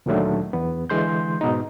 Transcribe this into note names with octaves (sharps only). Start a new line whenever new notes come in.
D2 A#2 D#3 F#3 A3 D4
E2 B3
D3 E3 G#3 C6 G6
G#2 B2 D#4